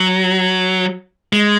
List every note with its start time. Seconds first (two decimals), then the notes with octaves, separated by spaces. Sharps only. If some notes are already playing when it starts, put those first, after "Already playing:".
Already playing: F#3
1.33 G#3